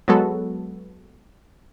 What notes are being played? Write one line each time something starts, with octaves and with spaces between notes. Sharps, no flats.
F#3 G#3 B3 F#4 A4